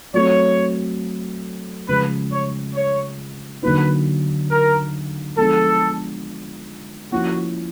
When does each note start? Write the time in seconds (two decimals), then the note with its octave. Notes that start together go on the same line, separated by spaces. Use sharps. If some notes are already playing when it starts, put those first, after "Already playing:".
0.14 F#3 A3 C4 C#5
1.88 C#3 F3 G#3 B4
2.32 C#5
2.75 C#5
3.63 D3 F#3 A#3 D#4 B4
4.50 A#4
5.37 F3 G#3 B3 D4 A4
7.12 F3 A#3 C#4 E4 F#4